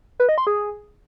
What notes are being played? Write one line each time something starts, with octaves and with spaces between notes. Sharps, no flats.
B4
D#5
C6
G#4